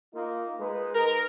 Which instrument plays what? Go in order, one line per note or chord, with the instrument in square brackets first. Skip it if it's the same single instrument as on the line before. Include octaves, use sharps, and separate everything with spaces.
[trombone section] A#3 D#4 F4
G#3 D#4 B4
[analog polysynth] A#4